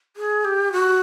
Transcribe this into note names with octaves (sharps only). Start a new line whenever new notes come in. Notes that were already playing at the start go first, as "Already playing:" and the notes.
G#4
G4
F#4